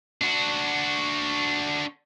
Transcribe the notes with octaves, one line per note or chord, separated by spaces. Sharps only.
D4 F#4